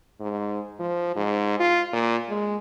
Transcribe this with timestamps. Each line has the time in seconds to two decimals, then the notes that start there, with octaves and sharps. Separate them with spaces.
0.20 G#2
0.79 F3
1.16 G#2
1.59 F4
1.93 A#2
2.29 G#3